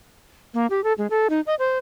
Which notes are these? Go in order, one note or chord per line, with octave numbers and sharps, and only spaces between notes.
A#3
G4
A4
G#3
A4
D#4
D#5
C5